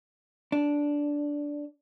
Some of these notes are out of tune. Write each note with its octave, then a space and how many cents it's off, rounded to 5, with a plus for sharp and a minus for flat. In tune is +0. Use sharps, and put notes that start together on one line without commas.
D4 -10